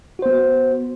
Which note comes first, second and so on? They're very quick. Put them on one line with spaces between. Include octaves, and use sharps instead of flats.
F#4 C5 B3